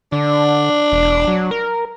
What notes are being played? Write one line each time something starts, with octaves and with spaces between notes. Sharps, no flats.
D3 D4
E1
F#3
A#4